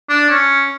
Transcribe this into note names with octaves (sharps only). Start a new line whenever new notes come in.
D4
C#4